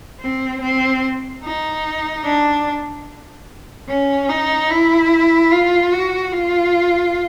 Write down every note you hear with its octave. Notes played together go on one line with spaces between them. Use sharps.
C4
C4
D#4
D4
C#4
D#4
E4
F4
F#4
F4